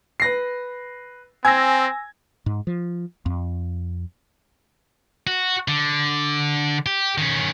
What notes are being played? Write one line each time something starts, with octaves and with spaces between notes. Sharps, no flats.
B4 A#6 C7
C4 G#5 E6 G#6 A#6
G#2
F3
F2
F#4
D3
G4
D#3 C#4